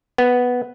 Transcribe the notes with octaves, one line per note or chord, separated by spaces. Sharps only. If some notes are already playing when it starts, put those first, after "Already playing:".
B3